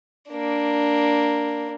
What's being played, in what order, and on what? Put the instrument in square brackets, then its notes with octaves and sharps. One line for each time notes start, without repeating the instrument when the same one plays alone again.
[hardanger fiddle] A#3 D4